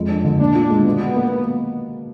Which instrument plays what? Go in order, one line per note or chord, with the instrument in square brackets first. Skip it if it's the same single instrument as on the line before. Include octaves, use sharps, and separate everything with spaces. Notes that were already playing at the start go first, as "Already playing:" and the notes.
Already playing: [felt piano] F2 G#3
D4
D3
[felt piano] A#2 [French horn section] D4
[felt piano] F4
G#3
[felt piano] B2 [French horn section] B3
[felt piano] F#4
A#3